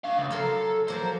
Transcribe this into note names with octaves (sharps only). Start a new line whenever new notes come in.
D4 F5
C#2
F#3 A4 A#4 C6
F3 F#3 A#3 C5